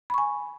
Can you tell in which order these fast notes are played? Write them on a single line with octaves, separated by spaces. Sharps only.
B5 C#6 G#5